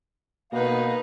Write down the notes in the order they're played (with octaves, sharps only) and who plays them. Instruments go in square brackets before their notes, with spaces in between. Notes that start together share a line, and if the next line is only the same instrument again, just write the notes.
[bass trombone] B2 [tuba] A#3 [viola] D#4 B4 [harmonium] F5